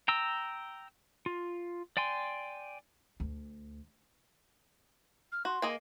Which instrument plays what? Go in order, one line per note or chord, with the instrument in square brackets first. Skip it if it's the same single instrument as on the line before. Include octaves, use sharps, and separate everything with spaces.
[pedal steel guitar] G5 A#5 E6
F4
D5 G5 G#5 C6
[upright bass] D2
[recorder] F6
[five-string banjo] F#4 [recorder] C6
[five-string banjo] A#3 G#4 D#5